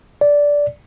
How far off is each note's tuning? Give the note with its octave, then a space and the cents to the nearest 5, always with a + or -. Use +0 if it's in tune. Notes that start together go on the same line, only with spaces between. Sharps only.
D5 -10